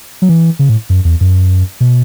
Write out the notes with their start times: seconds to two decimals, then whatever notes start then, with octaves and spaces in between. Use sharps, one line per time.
0.22 F#3
0.29 E3
0.59 C#3
0.69 A2
0.90 F#2
1.05 E2
1.21 F#2
1.80 B2